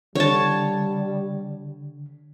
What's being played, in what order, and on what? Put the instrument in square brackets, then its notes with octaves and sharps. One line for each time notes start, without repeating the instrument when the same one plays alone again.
[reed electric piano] D3 [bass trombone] G3 [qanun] C#5 A5